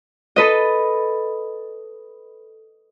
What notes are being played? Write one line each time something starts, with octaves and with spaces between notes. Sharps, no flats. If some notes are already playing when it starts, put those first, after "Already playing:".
A4 B4 D#5